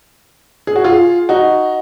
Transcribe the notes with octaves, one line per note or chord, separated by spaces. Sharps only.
G#4
F#4
F4 G#4
D#4 F#4